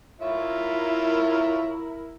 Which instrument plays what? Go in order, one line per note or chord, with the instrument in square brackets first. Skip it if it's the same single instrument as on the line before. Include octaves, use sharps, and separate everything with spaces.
[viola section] E4 A#4 [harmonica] F4 C#5 E5